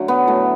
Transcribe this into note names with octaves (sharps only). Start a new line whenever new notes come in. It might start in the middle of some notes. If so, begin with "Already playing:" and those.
Already playing: D3 F#3 A3
B3
A2 F#3 A3